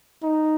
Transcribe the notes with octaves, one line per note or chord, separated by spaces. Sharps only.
D#4